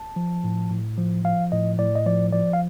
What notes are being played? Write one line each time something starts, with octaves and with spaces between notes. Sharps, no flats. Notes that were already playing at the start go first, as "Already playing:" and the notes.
Already playing: A5
F3
A2
A2
F3
F3 F5
A2 D#5
A2 D5
D#5
F3 D5
F3 D5
F5